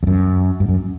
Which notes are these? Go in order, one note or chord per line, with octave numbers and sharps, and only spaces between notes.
F2
F#2
G2
F#2